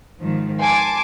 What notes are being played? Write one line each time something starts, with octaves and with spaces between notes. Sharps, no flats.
G#2 D#3 F3
G#5 A5 C6 D6